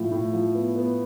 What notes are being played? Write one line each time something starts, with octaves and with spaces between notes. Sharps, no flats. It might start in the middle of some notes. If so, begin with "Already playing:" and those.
Already playing: A2 F3
A2
F3
B3
B3